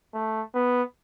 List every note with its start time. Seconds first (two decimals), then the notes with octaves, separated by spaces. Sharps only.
0.14 A3
0.54 B3